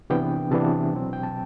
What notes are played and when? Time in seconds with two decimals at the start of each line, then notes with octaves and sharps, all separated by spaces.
0.10 C3 E3 B3 D4 G5
0.51 C3 E3 B3 D4 A5
0.93 B2 F#3 C4
1.13 G5
1.23 A5